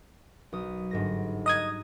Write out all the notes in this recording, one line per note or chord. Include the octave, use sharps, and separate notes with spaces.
B1 D#6
G1 G#2 A#6
D#5 A#5 D#6 F#6 G#6